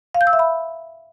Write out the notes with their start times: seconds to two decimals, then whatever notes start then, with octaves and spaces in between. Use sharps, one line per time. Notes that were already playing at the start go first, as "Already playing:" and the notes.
0.15 F5
0.21 G6
0.27 E6
0.33 E5
0.39 B5